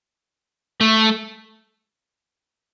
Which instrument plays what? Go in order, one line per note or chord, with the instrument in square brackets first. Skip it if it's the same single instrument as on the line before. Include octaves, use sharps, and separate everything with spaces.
[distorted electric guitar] A3